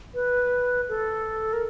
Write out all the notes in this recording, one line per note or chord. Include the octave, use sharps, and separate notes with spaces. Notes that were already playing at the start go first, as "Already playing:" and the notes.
B4
A4
A#4